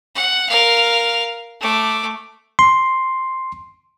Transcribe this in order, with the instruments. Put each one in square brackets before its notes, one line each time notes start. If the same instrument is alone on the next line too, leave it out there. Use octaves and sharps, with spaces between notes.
[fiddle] F#5
A#4 F5
A3 D6
[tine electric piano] C6